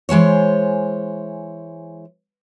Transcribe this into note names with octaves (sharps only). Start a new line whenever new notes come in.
E3 G#3 C5 C#5